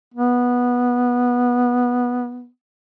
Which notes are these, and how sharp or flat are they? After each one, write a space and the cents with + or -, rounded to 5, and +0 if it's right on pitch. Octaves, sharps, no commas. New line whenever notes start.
B3 -10